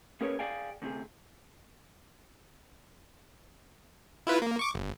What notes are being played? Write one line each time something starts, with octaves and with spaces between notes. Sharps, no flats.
A#3 C#4 G#4 A#4 B4 C#5
G#4 D5 F5 G5 G#5
D2 C3 G#4
E4 F4 B4
A#3
C#6 D6
G1